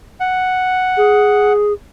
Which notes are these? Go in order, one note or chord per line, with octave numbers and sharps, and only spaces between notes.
F#5
G#4